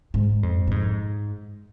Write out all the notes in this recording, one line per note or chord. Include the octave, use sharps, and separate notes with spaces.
G#2
F2
A#2
G#2